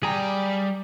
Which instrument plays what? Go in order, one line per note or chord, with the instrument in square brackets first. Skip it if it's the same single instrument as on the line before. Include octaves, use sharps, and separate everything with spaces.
[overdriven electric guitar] G3 G5 [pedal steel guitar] G#4 A#5